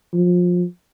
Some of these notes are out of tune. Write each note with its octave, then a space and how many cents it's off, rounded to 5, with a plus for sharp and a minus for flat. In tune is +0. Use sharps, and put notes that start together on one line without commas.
F3 +25